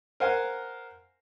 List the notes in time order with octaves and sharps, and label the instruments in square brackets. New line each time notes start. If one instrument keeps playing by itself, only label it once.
[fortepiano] A#4 C5 F5 F#5 G#5